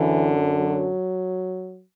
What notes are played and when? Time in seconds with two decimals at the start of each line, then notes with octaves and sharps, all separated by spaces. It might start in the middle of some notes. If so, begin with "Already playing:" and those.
Already playing: F#2 D3 E3
0.59 F#3